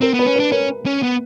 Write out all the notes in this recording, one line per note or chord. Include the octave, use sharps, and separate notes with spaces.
C4 A#4
B3
B4
C#4
B4
D4
C#4 A#4
C#4
B3